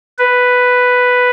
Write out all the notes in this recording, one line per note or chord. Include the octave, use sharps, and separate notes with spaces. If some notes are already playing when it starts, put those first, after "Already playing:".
B4